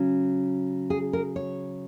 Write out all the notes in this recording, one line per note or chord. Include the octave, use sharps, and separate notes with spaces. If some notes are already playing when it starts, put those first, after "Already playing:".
Already playing: C#3 F#3 C#4
G#4
A#4
C#5